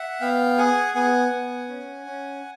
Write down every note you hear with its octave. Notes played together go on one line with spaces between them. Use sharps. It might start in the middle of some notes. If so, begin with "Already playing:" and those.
Already playing: E5 F#5
B3 F5 G5
G#4 F#5 G#5
B3 F#5 G#5
B3
C#4
C#4